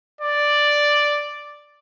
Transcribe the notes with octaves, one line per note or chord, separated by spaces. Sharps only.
D5